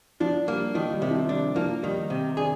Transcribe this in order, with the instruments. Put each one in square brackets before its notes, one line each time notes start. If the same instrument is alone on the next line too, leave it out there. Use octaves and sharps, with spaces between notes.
[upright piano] F3 [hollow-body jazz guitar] D4
[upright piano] G3 [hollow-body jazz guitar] A#3
[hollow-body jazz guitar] D#3 [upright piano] F3
[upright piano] G3
[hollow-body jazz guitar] C3
[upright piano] F3
[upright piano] G3 [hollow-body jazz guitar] D4
[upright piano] F3 [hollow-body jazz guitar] A#3
[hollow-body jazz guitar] D#3 [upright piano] G3
[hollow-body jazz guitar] C3
[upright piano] D4 [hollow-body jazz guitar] G#4